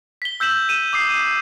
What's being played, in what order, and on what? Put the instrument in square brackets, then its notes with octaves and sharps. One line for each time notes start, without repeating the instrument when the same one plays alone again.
[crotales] B6 G7
E6 G6 B6 E7 F#7
D#7 E7
D6 D#6 C7
D#6 D#7